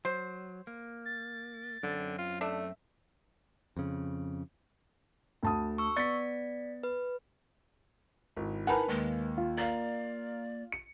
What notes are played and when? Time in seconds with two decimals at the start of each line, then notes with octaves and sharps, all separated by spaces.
0.05 F#3 C5
0.67 A#3
1.06 A6
1.83 F#2 D3 C4
2.18 F4
2.41 A3 D4 E5
3.77 F2 C#3
5.43 D2 A5 D#6
5.78 C#6 E6
5.97 B3 D5 A6 B6 C#7
6.83 B4
8.37 G#1 E4
8.67 D#4 A#4 B4 F#5 G#5 A5 B5
8.89 D#2 G#3 A#3
9.37 F4
9.58 A#4 D5 F5
10.72 C#7